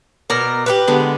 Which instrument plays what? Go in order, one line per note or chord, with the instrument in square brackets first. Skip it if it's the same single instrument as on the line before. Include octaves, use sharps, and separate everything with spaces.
[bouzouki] B2 A#4 [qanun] D5
[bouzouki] G4 A#4 B4
[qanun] D3 G#3 B3